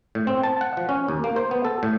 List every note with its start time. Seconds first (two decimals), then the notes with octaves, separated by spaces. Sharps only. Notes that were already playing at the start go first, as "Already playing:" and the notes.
0.15 A2
0.27 C4
0.43 A5
0.61 F#5
0.77 F3
0.89 C#4
1.08 D#2
1.24 A#3
1.36 C5
1.51 B3
1.65 A4
1.83 A2